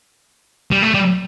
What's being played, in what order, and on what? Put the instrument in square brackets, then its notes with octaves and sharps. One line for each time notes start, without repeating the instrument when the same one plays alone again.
[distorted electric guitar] G3
A3
G3